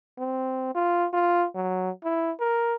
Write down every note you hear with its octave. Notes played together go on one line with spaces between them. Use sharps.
C4
F4
F4
F#3
E4
A#4